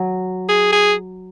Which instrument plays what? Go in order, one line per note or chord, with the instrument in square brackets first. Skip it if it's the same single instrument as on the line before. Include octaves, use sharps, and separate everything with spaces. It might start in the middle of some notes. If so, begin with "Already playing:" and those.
Already playing: [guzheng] F#3
[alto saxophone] G#4
G#4